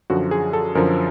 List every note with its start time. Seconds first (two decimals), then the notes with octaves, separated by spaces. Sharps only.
0.10 F#2 D3 F3 F#4
0.31 G#4
0.53 A4
0.75 F#2 D3 F3 A#4